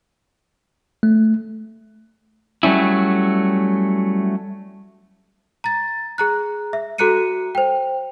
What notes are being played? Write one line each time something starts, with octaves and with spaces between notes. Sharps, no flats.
A3
F#3 G3 A3 C#4 E4
A#5 A6
G#4 A#5 F#6
E5
F#4 A4 A#5 F#6 C#7 D#7
C5 G5